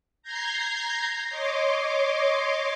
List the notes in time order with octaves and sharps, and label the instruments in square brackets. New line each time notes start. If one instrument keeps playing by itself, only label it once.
[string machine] A#5 G6 G#6 A#6 C7
C#5 D#5 C6 D6